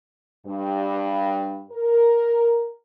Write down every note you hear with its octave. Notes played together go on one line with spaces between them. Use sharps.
G2
A#4